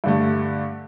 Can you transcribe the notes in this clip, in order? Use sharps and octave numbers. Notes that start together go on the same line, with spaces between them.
G2 D3 A3